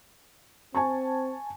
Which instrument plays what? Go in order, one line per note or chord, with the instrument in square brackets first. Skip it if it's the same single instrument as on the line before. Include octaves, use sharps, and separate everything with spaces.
[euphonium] C4 [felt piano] G#5 A5 C#6